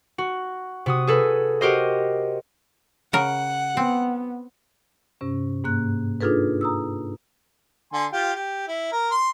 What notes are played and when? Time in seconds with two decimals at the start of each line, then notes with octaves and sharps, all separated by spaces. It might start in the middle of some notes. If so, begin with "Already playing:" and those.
0.18 F#4
0.86 C3 F#4 D#6
1.07 G#4 A4 B4
1.61 F#4 G4 A#4 C5 D#5
3.13 C#3 A#4 F#5
3.77 B3 C4
5.21 G2 C3 C#4
5.64 G#2 A#3 F#6
6.21 D4 D#4 F4 G#4 A4 B4
6.61 A#5 D#6 E6
7.93 D3 G#5 C6
8.13 F4 G4
8.35 G4
8.68 E4
8.92 A#4
9.11 C6